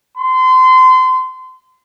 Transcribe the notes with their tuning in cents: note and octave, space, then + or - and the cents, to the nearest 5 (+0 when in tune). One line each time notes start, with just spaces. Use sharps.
C6 -30